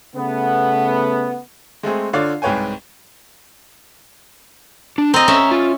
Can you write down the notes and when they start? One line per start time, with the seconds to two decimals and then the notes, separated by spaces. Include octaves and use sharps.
0.16 C#3 A3 B3
1.83 G#3 A3 C4 G#4
2.13 D3 F4 C#5 D5 C7
2.42 C2 G#2 B4 C#5 G5 G#5
4.98 D4
5.14 C4 D#5 A#5
5.28 C#4 E5
5.51 F4